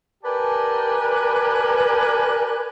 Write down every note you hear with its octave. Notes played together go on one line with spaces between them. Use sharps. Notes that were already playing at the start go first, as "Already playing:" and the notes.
G4 A#4 B4 D5 G#5 A5